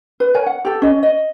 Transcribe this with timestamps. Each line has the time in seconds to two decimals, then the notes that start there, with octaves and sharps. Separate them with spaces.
0.20 B4
0.34 A#4 C#5 G#5
0.46 F#5
0.65 G4 A4
0.82 C#4 D#5
1.03 D#5